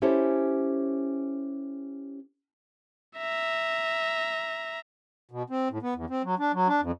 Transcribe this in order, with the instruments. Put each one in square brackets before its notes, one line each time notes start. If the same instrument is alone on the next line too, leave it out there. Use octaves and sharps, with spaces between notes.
[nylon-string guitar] C#4 E4 G4 A4 C5 C#5
[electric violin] E5 A#5
[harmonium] B2
C4
A2
B3
E2
C4
F#3
D4
F#3
D4
F2